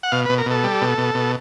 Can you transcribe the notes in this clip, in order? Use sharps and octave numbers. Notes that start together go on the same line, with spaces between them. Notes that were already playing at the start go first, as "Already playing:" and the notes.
F#5
B2 F5
B2 B4
A#4
B2 A4
G3
B2
B2
B2